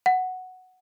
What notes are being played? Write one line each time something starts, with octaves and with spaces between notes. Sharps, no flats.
F#5